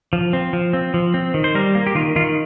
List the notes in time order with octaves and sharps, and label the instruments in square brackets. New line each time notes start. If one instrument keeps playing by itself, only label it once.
[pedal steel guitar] F3
C4
F3
C4
F3
C4
D#3
C5
G3 A#4
A#3
G4
D#3 F4
D#3 F4